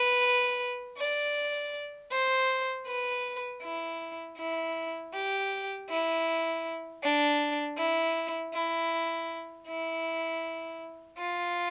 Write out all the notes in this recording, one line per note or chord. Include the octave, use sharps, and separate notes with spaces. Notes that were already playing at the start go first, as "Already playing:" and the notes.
Already playing: B4
D5
C5
B4
E4
E4
G4
E4
D4
E4
E4
E4
F4